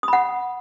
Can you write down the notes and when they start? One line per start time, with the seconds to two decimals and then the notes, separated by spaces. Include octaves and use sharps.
0.03 D#6
0.08 B5
0.13 F#5